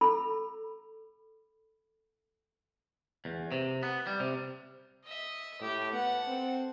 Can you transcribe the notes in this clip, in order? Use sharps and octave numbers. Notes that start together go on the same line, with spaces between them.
A4 B5 E6
E2
C3
B3
G3
C3
D#5 E5
A2 G4
B3 A4 F#5
C4